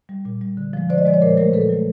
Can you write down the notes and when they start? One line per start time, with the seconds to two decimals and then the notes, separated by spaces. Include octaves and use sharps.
0.09 G3
0.25 A#2
0.41 G3
0.57 D3
0.73 F3 G#3
0.89 D3 C5 D5
0.98 D#5
1.05 F3 G#3 D5
1.14 C#5
1.21 A#2 A#4 C5
1.37 F#3 A3 A#4 C5
1.53 A#2 A4 B4
1.69 F#3 A3